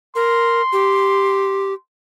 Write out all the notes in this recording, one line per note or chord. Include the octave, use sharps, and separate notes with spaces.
A#4 C6
G4